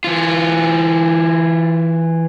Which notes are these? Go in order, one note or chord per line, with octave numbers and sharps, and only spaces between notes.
E3 F4